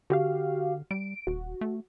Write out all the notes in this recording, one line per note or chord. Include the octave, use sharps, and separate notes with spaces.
D3 F#4 G4 F5
G3 D7
D#1 F#4
A3